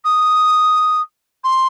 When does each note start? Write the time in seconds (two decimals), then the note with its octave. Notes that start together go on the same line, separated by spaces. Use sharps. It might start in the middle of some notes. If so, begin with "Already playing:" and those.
0.05 D#6
1.44 C6